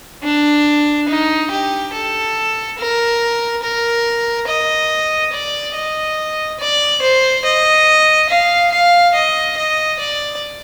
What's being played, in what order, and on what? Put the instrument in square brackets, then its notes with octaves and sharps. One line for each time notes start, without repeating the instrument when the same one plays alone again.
[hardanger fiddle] D4
D#4
G4
A4
A#4
A#4
D#5
D5
D#5
D5
C5
D#5
F5
F5
D#5
D#5
D5